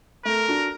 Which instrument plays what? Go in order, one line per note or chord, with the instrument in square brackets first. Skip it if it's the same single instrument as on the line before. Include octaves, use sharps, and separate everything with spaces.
[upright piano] A3 [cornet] A#4
[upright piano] D4 F#4